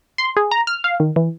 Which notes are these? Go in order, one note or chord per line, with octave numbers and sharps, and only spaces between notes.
C6
G#4
A#5
F6
F5
D#3
E3